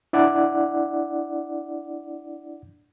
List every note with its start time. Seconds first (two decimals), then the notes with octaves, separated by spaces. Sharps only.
0.13 D4 E4 D5 F#5